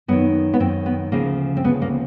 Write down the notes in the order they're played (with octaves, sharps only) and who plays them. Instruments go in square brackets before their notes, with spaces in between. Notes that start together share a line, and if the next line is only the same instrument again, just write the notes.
[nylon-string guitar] F#2 D#3 B3
B3
F#2 D#3 C4
B3
D2 C#3 F3 A#3
C4
D2 C#3 F3 B3
A#3